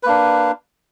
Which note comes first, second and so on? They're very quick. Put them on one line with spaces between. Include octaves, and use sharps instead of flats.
B4 A#3 D4